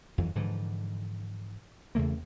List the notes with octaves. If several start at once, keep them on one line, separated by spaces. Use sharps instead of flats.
F2 E3 F#3
G#2 D3 E3 F3
E2 C#3 A3 A#3